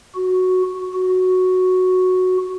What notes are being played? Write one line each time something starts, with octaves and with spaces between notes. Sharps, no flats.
F#4
F#4